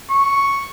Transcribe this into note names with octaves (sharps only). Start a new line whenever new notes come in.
C#6